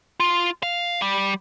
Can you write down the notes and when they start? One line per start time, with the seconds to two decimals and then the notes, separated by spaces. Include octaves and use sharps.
0.20 F4
0.63 F5
1.02 G3